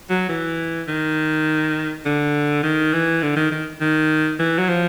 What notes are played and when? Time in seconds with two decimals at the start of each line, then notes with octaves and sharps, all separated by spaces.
0.10 F#3
0.29 E3
0.88 D#3
2.06 D3
2.63 D#3
2.93 E3
3.22 D3
3.37 D#3
3.52 D#3
3.81 D#3
4.39 E3
4.59 F#3
4.69 F3